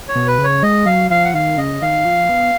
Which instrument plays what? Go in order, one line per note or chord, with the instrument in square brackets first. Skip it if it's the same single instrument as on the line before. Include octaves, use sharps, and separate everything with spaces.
[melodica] C#5
[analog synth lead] B2
[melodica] B4
[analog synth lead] C#3
[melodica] C#5
[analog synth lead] G#3 [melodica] D#5
[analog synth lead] F#3 [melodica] F5
[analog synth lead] F3 [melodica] F5
[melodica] F#5
[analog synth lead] D#3 [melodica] F5
[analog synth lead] C#3 [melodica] D#5
[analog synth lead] D#3 [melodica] F5
[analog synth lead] F3
B3